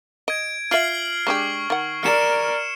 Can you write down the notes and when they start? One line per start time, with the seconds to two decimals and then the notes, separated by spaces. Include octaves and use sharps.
0.28 D#5 G#6 D7
0.71 F4 E5 F6 C7 F#7
1.27 G#3 D4 G4 C#6
1.70 D#3 F#5
2.03 A#4 D5 F6 C#7 E7